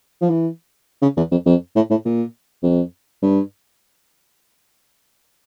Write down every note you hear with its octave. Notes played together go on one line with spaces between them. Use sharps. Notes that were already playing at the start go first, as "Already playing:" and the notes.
F3
E3
C#3
E2
F2
F2
A2
A2
A#2
F2
G2